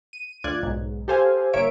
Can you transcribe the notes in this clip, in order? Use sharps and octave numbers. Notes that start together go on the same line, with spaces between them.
D#7
D2 F4 D5 F#6 G#6
B1 G#2
G4 A4 C5 F5 G#5
G1 A#3 C#5 E5 D7